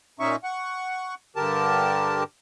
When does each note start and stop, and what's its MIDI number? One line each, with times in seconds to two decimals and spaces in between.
0.20 0.36 46
0.20 0.36 61
0.20 0.36 63
0.20 0.36 76
0.20 0.36 85
0.44 1.15 78
0.44 1.15 85
1.36 2.23 43
1.36 2.23 50
1.36 2.23 67
1.36 2.23 70
1.36 2.23 81